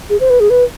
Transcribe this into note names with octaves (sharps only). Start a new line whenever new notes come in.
G#4
C5
B4
G#4
B4